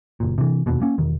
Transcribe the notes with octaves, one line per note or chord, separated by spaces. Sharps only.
F#1 A#2
C3 E3
F1 D#2 B2
A#3 C#4
E1 D#3